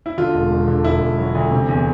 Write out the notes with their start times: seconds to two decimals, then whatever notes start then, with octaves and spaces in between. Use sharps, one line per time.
0.06 E4
0.17 D3 F4
0.34 E1
0.50 E1
0.68 D3
0.84 E1 E4
1.01 E1
1.19 F#3
1.35 D2
1.51 C3
1.68 E2